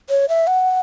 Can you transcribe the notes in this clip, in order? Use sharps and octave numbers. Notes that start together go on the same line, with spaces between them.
C#5
E5
F#5